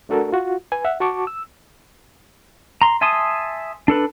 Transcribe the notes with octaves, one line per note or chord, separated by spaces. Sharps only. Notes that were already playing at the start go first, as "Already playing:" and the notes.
A3 D4 F#4 A4 A#4
F4 F#4
B4 G#5
E5 F#5
F#4 A5 C#6 D6
E6
A#5 C6
E5 G#5 A5 C6 D#6
D4 A4 B4